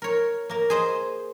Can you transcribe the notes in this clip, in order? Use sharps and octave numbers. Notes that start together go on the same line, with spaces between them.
A#4 C#5
A#3 A#4
G#4 C5 D#5